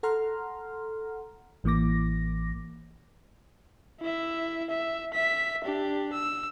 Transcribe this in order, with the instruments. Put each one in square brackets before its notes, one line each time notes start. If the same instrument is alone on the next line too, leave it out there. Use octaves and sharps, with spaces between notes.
[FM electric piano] A4 F#5 A#5 C6 F6
A1 E3 A#3 D6 A#6
[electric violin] E4 E5
E5
E5 B6
D4 G4
E6